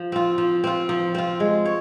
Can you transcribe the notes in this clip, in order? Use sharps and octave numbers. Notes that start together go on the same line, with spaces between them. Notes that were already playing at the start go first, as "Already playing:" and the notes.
Already playing: F3
C4 F4
F3
C4 F4
F3
C4 F4
G#3
C#5